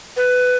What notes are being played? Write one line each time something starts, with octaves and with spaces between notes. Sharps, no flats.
B4